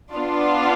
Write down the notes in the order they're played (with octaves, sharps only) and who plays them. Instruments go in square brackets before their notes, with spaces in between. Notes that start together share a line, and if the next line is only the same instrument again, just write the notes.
[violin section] B3 D4 F4